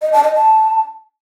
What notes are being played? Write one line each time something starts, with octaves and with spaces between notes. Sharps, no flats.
D#5
A5
D#5
A5